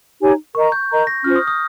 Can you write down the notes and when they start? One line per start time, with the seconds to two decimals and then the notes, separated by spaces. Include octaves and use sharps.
0.21 D#4 G4 C#5 G#5
0.55 A#4 D#5 A#5 C#6
0.72 G6
0.90 A#4 D#5 A#5
1.07 A#6
1.24 C#4 F4 C5 F6
1.36 D#6
1.47 D#6